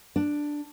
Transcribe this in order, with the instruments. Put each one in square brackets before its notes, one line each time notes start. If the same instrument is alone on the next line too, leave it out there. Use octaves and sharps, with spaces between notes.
[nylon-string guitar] D4